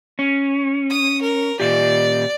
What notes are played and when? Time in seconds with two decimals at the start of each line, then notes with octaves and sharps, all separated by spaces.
0.19 C#4
0.90 D#6
1.21 A#4
1.60 A#2 G4 D5